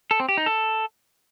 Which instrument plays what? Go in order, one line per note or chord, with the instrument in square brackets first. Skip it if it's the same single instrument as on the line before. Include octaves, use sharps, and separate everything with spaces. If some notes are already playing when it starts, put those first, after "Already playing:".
[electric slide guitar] A4
C4
G4
D#4
A4